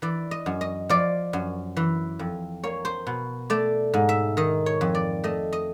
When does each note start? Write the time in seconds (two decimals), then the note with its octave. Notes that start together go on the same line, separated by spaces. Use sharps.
0.02 E3 D5
0.31 D#5
0.46 F#2
0.61 D#5
0.89 F3 D5
1.33 F#2
1.77 E3
2.19 F2
2.64 A#3 C#5
2.85 C5
3.07 B2
3.50 A3 D5
3.94 G#2
4.09 E5
4.37 D#3 D#5
4.66 C#5
4.81 F2
4.95 D5
5.24 A3 D#5
5.53 D#5